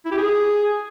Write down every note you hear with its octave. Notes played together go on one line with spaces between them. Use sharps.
E4
G4
G#4